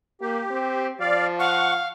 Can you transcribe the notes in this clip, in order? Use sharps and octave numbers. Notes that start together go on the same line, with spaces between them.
A#3 G4
C4
F3 D5 F5
F5 F#5 C#6